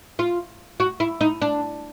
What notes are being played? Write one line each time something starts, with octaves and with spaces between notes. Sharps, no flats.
F4
F#4
E4
D#4
D4